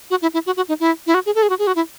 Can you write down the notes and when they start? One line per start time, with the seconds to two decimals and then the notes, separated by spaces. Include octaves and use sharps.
0.10 F#4
0.22 E4
0.34 E4
0.46 F#4
0.57 F#4
0.69 D#4
0.80 E4
1.07 E4
1.14 F#4
1.26 G#4
1.35 A4
1.43 G#4
1.50 F#4
1.59 G#4
1.67 F#4
1.76 E4